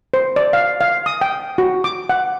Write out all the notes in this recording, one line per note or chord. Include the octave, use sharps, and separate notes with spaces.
C5
D5
F5
F5
D#6
G5
F#4
D6
F#5